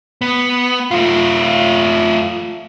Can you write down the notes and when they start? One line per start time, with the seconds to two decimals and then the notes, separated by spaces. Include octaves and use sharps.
0.21 B3
0.91 A3 F4